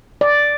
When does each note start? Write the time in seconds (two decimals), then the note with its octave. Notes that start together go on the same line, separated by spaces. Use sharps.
0.21 D5